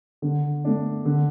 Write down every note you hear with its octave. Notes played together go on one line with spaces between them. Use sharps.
D3
A3 D4
D3